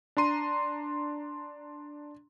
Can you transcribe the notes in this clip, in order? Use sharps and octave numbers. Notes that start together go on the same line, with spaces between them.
D4 A#5 C6 D#7